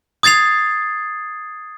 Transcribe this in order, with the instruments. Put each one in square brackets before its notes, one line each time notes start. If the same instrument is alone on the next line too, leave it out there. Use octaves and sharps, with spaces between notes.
[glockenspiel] D#6 G#6 A6 C7 F7